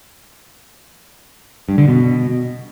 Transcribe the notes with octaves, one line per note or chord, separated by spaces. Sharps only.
G2
D3
B2